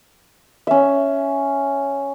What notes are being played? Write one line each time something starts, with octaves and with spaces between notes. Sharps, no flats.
C#4 E5